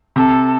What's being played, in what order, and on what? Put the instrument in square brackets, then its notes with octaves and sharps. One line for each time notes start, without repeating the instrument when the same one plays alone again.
[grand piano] C3 [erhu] A4